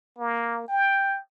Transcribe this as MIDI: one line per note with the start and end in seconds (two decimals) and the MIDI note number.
0.19 0.64 58
0.68 1.19 79